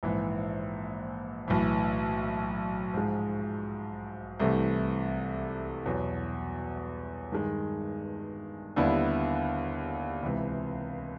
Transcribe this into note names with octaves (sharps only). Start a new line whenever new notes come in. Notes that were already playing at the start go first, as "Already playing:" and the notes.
A#1 G#2 E3
B1 A2 E3
G#2 F3 G#3
C2 C3 E3 A3
E2 B2 F#3
G2 D#3 G#3
D#2 D3 G3 B3 E4
C#2 C3 E3